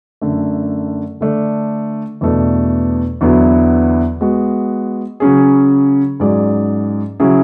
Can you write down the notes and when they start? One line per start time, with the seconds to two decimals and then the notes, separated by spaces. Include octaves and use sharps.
0.22 F#2 D3 A3
1.21 D3 A3 D4
2.21 E2 B2 A3 D4
3.21 E2 D3 F#3 B3 E4
4.21 G#3 B3 F#4
5.20 C#3 F#3 C#4 G#4
6.20 G#2 F#3 C#4 G#4 D5
7.20 C#3 F#3 C#4 E4 G#4